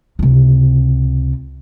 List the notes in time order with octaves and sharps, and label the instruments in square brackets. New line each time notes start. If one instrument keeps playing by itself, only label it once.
[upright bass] C#2 C3